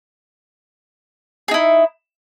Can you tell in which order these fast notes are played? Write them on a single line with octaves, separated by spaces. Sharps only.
G#4 D#4 E4